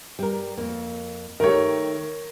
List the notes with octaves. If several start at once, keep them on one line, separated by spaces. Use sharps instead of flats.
G3 A#4
F2 A#3
D#3 A3 G4 A#4 C#5